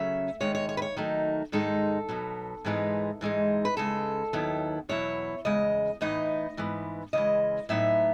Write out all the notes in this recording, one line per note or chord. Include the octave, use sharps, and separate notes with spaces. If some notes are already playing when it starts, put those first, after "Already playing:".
Already playing: C#3 F#3 A3 C#4 E5
D#2 D#3 G#3 C#5
C#5
C#5
B4
C#5
D#3 F#3 A3 D#4
G#2 D#3 G#3 D#4 A4
B2 F#3 B3
G#2 E3 G#3 B3 D#4
G#2 E3 G#3 D#4
B4
C#3 G#3 B3 A4
D#2 D#3 F#3 B3 E4
E2 B2 F#3 B3 E4 C#5
E2 C#3 G#3 D#5
A2 E3 B3 D#4 D#5
G#2 E3 B3
C#3 E3 G#3 D#5
A2 F#3 B3 D#4 E5